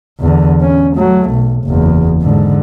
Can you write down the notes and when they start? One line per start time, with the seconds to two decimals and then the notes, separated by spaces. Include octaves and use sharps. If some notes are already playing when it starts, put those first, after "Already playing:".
0.20 E2 D3
0.62 C#4
0.96 F#3 A3
1.30 B1
1.65 F#1 E2
2.22 G#2 D3